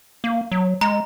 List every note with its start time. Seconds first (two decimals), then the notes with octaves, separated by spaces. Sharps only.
0.24 A#3
0.52 F#3
0.81 G#3 A#5